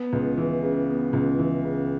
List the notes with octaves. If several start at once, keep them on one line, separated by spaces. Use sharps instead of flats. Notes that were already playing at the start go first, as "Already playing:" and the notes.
Already playing: B3
C#2
E3
C#3
B3
C#2
E3
C#3